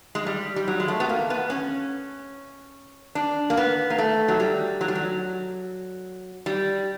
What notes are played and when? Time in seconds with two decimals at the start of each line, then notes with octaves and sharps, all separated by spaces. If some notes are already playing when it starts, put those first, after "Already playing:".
0.15 G#3
0.26 G3
0.56 G3
0.68 F#3
0.80 G#3
0.88 A3
1.00 B3
1.09 A#3
1.30 B3
1.50 C#4
3.15 D4
3.50 A#3
3.57 B3
3.90 A#3
3.98 A3
4.28 F#3
4.40 G3
4.81 F#3
4.88 G3
4.95 F#3
6.46 G3